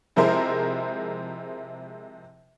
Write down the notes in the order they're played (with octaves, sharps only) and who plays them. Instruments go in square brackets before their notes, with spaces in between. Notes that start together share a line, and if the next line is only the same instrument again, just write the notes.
[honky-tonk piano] C3 F3 G#3 E4 A#4 C5